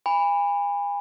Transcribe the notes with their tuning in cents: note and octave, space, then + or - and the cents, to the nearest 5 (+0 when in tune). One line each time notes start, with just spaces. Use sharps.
G#5 -40 B5 +0